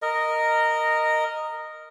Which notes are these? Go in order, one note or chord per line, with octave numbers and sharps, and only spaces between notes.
A#4 D#5